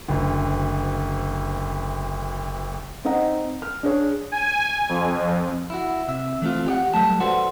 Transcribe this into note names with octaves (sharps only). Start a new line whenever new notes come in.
F#1 D2
C4 D#4 D#5 F#5 A#5
F6
D4 G#4 C#5
G#5
F2
E4 F#4
C3 E5
E3 A3 C4 F4
G4 D5 F#5
F#3 G3 A3 A5
F#4 A4 B4 C5 D5 F#5